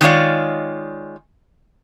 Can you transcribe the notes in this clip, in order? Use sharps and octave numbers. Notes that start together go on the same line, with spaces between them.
D#3 G#3 D4 F4 C#5 D5